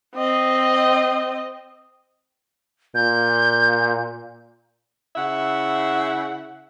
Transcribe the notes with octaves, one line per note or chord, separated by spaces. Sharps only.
C4 D#5
A#2 G6
C#3 E4 E5 F#5